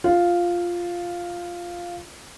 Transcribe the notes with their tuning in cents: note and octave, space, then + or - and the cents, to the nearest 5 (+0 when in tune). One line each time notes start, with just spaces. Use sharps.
F4 +0